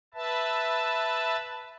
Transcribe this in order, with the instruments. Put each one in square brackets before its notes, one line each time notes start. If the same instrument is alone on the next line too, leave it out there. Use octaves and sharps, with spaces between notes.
[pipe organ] B4 E5 A5